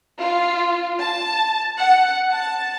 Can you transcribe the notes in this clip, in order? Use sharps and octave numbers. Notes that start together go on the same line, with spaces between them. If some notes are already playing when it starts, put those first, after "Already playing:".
F4
A5
F#5
A5